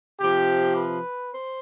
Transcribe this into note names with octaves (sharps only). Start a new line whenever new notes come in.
C3 F3 G4
B4
C5